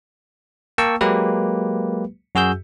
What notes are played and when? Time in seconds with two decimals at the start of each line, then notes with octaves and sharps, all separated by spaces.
0.78 A#3 G5 A5 C#6 E6
1.01 F#3 G#3 A#3 G4 B4
2.35 F#2 F#4 G#4 E6 G6